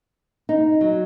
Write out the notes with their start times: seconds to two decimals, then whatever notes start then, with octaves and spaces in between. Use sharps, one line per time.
0.49 D#4
0.81 F#3